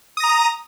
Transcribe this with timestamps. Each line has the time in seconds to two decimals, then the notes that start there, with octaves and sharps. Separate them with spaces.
0.17 D#6
0.20 A#6
0.23 A#5